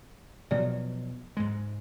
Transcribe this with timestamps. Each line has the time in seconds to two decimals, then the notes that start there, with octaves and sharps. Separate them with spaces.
0.51 B2 F3 F#3 D5
1.37 G#2 G#3